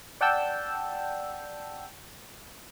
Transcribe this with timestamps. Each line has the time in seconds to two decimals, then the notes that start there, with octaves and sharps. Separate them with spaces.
0.21 D5 F#5 G5 A5 E6 G6